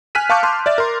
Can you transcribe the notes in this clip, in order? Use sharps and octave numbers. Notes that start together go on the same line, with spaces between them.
G#5 F6 F#6 B6 D#7
F5 A5 C#6 D6 F#6 G6
A5 C6 F6
D5 E5 A6
A#4 C6